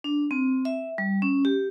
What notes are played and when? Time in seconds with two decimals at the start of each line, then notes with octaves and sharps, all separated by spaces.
0.04 D4
0.31 C4
0.65 E5
0.98 G3
1.22 C#4
1.45 G4